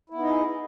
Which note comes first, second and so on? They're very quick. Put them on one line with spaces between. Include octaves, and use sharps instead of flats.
E4 B3 D#4 D#5 G#4